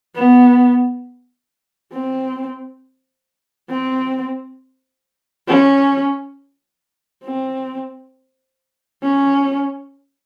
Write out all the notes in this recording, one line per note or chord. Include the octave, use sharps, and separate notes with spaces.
B3
C4
C4
C#4
C4
C#4